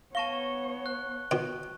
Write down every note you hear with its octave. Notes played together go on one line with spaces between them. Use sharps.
B3 C#5 F5 A5 C#6 A#6 E7 G7
F#6
B2 D#3